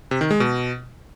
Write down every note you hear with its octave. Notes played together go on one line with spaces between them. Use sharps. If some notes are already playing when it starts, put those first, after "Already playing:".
C3
D#3
G#3
B2